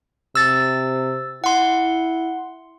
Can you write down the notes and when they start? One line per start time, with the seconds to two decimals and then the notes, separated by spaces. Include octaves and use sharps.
0.35 C3 E6 A6
1.44 E4 F#5 C6